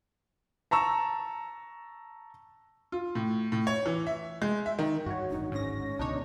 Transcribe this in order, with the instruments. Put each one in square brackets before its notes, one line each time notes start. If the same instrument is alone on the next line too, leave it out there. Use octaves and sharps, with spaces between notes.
[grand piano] A5 A#5 C#6 E6
[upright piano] F4
A2
A2
C#5
E3
E5
G#3
E5
D#3
[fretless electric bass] G2 D#3 [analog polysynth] F#4 C#5
[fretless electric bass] D1 G#1 D4 [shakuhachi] D#4
[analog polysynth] G#2 A#6 [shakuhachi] C#4
[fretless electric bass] C#2 B2 D3 [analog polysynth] D4 D#4 C#5